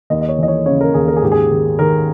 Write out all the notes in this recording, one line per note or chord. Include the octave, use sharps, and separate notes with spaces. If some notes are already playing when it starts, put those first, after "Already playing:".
D#2 D#5
D#5
C#5
E3 D#5
C#5
C#3 C#5
A#4
D#2 G#4
A#4
G#4
G#2 G4
G#4
D#3
D#3 A#4